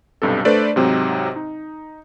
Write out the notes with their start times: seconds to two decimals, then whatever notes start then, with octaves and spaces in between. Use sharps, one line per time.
0.22 B1 G2 C3 A4
0.45 A3 D4 A4 B4 C5 D5
0.76 G#2 C3 F#3 C4 D#4
1.36 D#4